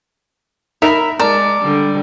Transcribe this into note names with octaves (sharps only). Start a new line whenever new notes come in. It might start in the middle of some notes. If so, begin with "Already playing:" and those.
D#4 A#4 E5 A#5 B5
G#3 A#4 D5 A5 A#6
D3 G3